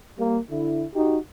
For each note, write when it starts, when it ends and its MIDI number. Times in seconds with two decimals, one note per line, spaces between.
0.18 0.39 55
0.18 0.39 58
0.51 0.84 50
0.51 0.84 64
0.94 1.18 63
0.94 1.18 66
0.94 1.18 67